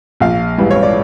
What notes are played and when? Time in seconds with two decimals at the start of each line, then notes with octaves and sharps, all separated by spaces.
0.20 A#1 F5
0.58 G#2 E3 G3
0.71 C#5
0.83 D5